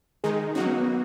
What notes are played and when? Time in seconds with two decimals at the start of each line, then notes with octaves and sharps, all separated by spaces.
0.24 D#3 G#3 D#4 G#4
0.55 F#3 A#3 C#4 D#4 F#4
0.66 B3
0.77 B3